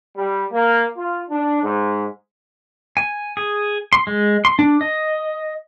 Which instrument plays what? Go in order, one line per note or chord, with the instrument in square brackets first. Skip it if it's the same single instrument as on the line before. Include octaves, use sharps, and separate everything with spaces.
[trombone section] G3
A#3
F4
D4
G#2
[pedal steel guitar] G#5
G#4
C6
G#3
C6
D4
D#5